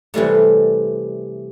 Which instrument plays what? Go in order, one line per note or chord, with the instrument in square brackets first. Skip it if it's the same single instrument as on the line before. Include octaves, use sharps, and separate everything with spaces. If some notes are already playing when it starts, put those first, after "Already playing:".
[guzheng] C3 E3 G3 A3